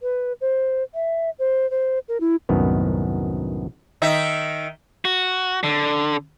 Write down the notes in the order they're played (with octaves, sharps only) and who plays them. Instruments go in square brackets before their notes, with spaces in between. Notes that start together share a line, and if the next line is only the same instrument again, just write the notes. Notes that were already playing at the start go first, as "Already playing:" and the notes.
[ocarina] B4
C5
E5
C5
C5
A#4
E4
[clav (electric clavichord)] C2 F#2 A2 D#3 B3
[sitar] D#3 D#4 E5
[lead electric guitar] F#4
D3